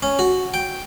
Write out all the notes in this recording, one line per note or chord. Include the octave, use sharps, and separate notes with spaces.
C#4
F#4
G5